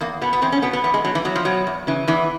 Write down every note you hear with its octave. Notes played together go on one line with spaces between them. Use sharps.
E2 A#3
B2 B3
B3
E2 C4
C#4
B2 B3
B3
E2 B3
G#3
B2 F#3
E3
E2 F#3
F3
B2 F#3
E2
C#3 E3
E2 E3